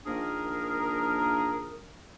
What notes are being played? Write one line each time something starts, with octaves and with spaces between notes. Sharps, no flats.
D#3 F3 A#3 D4 G#4 A#4